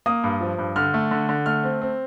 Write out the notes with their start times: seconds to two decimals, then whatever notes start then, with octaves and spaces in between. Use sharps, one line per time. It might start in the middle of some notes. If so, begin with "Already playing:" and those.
0.06 A#3 D#6
0.24 G2
0.41 F3
0.59 G2
0.76 D3 F6
0.94 A3
1.11 D3
1.29 D3
1.46 A3 F6
1.63 C4
1.81 C4